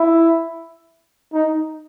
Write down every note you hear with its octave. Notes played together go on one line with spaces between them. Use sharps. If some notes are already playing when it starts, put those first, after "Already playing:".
Already playing: E4
D#4